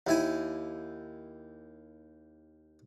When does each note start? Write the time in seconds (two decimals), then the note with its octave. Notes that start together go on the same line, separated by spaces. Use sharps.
0.07 D#2 E4 G#5